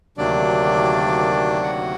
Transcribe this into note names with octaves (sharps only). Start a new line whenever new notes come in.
D2 C3 D#3 F#3 A#3 D4 D5
F#4 F#5